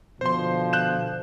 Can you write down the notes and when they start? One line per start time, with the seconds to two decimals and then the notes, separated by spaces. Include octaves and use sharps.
0.21 B2 D3 F3 C5 C6
0.73 F#6 G6 E7